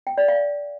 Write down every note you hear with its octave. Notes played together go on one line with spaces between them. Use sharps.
G5
D5
F5